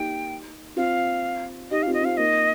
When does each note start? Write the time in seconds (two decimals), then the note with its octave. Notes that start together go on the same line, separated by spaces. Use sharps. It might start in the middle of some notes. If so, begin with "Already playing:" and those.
Already playing: A#3 D#4 G4 G5
0.76 C4 F4 F5
1.71 D#4 G4 D#5
1.83 C4 F4 F5
1.94 D#5
2.02 C4 F4 F5
2.17 A#3 D#4 D#5